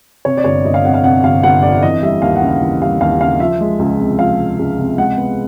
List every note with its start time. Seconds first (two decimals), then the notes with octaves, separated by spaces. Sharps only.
0.25 C3 C#5
0.37 D5
0.44 G1 C#5
0.65 G1 D#5
0.74 F5
0.85 F2 F#5
0.94 F5
1.04 C3 F#5
1.24 G1 F5
1.43 G1 F#5
1.63 F2 D5
1.82 E3 D#5
2.02 G3 E5
2.22 D#2 F5
2.36 F#5
2.42 C#3
2.49 F5
2.61 E3
2.82 G3 F5
3.01 D#2 F5
3.20 C#3 F5
3.40 F3 E5
3.61 G#3
3.79 C#2
4.00 C3
4.19 F3 F5
4.39 G#3
4.59 C#2
4.79 C3
4.98 G#3 F#5
5.18 B3